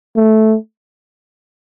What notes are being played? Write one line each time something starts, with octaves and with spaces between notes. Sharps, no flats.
A3